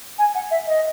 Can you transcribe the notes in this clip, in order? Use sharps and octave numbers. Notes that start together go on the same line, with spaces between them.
G#5
F#5
E5
D#5